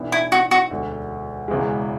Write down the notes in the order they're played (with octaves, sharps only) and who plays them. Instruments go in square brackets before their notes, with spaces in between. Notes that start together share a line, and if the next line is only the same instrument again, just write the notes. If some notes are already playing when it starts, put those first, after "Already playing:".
Already playing: [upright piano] B1 A2 E3 B3 D4
[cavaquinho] E4
F#4
F#4
[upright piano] E1 D2 D3
E1 E2 C#3 E3 G#3